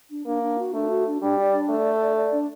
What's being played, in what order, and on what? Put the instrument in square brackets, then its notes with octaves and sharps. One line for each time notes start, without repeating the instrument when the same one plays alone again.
[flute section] D4
[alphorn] A#3 [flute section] D4
[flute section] D4
F#4
[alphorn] A3 [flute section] D4
[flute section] F#4
D4
[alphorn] G3 [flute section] D4
[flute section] D5
D4
[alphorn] A3 [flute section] D5
[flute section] A4
D5
D5
D4